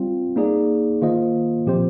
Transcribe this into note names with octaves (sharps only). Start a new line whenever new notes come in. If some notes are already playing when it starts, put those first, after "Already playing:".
Already playing: G3 C4 F4
A#3 D#4 G#4 D5
D#3 A#3 F4 C5 D#5
A#2 F3 C4 G4 C5